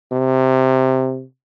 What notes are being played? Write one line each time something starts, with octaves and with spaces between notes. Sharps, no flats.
C3